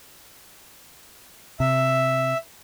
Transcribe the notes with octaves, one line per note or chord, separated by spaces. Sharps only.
C3 E5